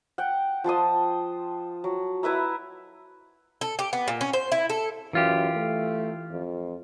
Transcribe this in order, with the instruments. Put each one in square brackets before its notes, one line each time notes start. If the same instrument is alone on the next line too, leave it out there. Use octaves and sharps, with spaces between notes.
[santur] F#5 G5
F3 A5 C6 D#6
F#3
E4 B4 E5 A#5
[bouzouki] A4
G4
B3
A#2
C#4
C5
E4
A4
[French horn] F#2 [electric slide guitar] E3 F4 G4
[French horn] A3
F2